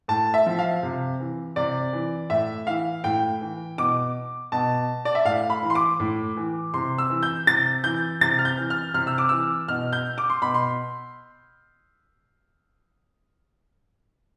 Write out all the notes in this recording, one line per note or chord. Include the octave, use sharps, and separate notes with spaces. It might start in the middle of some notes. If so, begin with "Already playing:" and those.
A2 A5
E5
F3
F5
C3
E3
C3 D5
E3
A2 E5
E3 F5
A2 G5
E3
B2 D6
B2 A5
D5
E5
A2 F5
B5
E3
C6
D6
A2
E3
C3 C6
E6
E3
G6
C3 A6
E3 G6
C3 A6
F6
G6
E3
F6
C3 F6
E6
D6
E3 E6
B2 F6
G6
D6
C6
B2 B5
C6